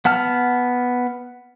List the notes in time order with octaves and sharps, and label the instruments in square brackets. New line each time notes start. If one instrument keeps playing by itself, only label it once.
[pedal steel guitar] B3 F#5 A5 F6